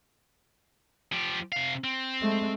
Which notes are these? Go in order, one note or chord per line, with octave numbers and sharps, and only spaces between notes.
F3 G4
C3 F5
C4
G#3 A3